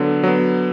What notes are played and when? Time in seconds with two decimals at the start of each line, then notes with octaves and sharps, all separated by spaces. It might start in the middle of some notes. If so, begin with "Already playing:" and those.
Already playing: D3 F#3 B3
0.23 F#3 B3